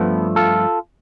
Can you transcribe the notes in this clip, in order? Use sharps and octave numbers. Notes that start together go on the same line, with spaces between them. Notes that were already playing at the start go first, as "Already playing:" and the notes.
Already playing: G2 F3 A3 B3
F4 A4